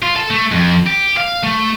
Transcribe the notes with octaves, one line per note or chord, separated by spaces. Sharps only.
F4
A4
A3
F2
G4
F5
A3